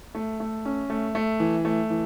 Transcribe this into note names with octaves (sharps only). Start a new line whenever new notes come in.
A3
A3
C#4
A3
A3
E3
A3
E3